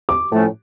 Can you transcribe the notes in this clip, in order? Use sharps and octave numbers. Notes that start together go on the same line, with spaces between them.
D6
A2 F3 A3 C#4